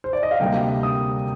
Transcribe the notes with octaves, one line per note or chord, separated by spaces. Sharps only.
C5
D5
D#5
F5
D2 C3 G3 A#3 G5
D#6